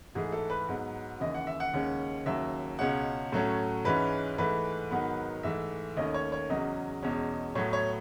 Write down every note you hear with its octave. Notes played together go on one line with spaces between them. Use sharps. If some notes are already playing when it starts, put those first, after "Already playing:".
G#2 E3 A3 G#4
A4
B4
G#2 F#3 B3
D#2 C#3 E3 D#5
F#5
E5
F#5
D#2 C#3 G#3 C#4
D#2 C#3 F#3 E5
C#2 B2 G#3 C#4 F#5
A2 F#3 A3 C#4
G#2 E3 G#3 C#4 B4
G#2 E3 A3 B4
G#2 D#3 F#3 B3
G#2 E3 A3 E5
D#2 D#3 A3 C#4 D#5
C#5
C#5
E2 C#3 F#3 C#4 D#5
E2 B2 G#3 C#4
A2 F#3 B3 C#5
C#5